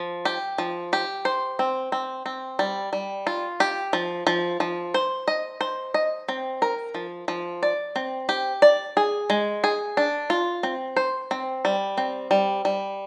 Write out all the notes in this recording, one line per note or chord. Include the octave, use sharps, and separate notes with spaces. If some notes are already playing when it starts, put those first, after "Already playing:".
Already playing: F3
G4
F3
G4
C5
C4
C4
C4
G3
G3
F4
G4
F3
F3
F3
C5
D#5
C5
D#5
C4
A#4
F3
F3
D5
C4
G4
D5
G#4
G#3
G#4
D4
F4
C4
C5
C4
G3
C4
G3
G3